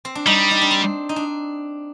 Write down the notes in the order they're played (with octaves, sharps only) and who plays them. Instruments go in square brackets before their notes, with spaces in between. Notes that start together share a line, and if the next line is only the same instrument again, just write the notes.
[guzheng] C4
D4
[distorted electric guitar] G3 [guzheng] D#4
[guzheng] D#4
D4
C4
D#4
D4